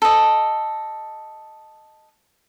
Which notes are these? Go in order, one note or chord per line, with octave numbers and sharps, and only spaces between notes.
A4 D#5